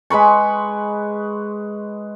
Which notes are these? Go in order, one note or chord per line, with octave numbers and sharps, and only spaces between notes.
G#3 B4 B5 C#6